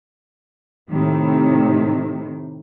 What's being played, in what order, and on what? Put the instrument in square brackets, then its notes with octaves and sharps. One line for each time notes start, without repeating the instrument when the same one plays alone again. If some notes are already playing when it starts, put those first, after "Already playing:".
[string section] A2 C3 D#3